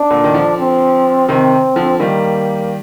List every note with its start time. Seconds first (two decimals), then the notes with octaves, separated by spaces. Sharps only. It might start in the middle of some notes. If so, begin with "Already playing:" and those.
Already playing: D4
0.10 A#2 D3
0.24 D#3
0.34 D3 F3
0.58 C4
1.28 C3 D#3 C4
1.76 D3 F3
1.99 D#3 G3 A#3